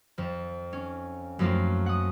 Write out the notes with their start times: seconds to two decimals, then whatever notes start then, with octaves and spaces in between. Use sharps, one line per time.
0.18 F2 F3
0.73 C#4
1.39 F#2 F3 A3 A#3 C4 F4
1.86 F#5 D#6